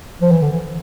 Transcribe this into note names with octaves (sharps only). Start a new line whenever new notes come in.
F3
E3
D3
E3